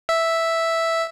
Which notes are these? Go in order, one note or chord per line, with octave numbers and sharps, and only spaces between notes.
E5